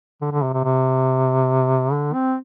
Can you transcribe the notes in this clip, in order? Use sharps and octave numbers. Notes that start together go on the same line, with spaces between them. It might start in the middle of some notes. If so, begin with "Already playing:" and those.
D3
D3
C3
C3
C3
D3
C4